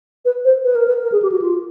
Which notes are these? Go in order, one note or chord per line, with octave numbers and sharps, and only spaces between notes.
B4
C5
B4
A#4
B4
A#4
G#4
G4
F#4
F4